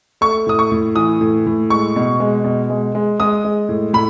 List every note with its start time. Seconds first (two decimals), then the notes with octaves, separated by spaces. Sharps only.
0.21 A3 C#6
0.47 A2 D#6
0.59 C#6
0.72 A2
0.96 E3 D#6
1.21 A2
1.46 A2
1.70 G#3 C#6
1.96 B2
2.20 G#3
2.44 B2
2.70 G#3
2.95 G#3
3.20 G#3 D#6
3.44 G#3
3.69 A2
3.93 A2 B5